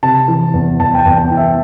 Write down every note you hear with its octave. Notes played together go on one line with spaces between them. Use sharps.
C3 A5
E3
E2
E2 A5
G5
A5
E2
G5
E3
E5